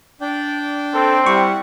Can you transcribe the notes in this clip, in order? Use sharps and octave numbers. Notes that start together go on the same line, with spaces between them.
D4 D5 G5
C4 A4
G3 E4 F#5 C#6